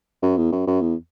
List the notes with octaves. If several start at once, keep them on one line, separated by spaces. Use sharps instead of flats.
F#2
E2
F#2
F#2
E2